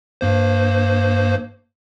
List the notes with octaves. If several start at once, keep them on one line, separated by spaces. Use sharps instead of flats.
G2 A#3 C5